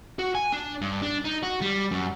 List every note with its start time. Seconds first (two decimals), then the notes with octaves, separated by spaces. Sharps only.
0.19 F#4
0.35 G#5
0.52 D4
0.81 G2
1.02 D4
1.25 D#4
1.43 F#4
1.61 G3
1.91 F#2